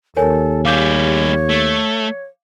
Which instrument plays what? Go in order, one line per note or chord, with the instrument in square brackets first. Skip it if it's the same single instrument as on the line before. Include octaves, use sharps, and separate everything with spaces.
[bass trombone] D#2 [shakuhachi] A4 [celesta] A#4 C#5 G#5
[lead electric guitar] G3 G#4 [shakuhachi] C#5 [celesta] F5 D6 G6
[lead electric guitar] A3